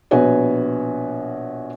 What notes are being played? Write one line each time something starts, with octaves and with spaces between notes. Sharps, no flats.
A#1 B2 F#4 B4 C#5 G#5